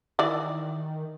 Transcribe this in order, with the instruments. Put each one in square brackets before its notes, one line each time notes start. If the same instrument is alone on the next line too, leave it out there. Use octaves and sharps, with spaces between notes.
[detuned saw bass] D#3 [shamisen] E3 E4 D5